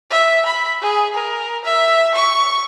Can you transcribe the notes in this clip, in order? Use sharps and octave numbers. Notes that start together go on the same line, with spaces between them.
E5
B5
G#4
A#4
E5
C#6